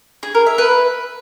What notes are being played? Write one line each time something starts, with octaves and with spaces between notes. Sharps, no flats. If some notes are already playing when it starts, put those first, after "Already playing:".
G#4
A#4
E5
B4